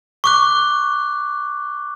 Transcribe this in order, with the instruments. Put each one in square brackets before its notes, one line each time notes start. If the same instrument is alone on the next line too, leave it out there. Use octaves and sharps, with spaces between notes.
[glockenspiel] C#6 D6 F#6